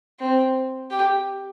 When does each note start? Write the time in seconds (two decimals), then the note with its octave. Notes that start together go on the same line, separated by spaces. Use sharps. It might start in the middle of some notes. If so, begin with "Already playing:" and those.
0.19 C4
0.91 G4